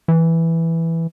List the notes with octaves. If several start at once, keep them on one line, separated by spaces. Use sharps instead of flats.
E3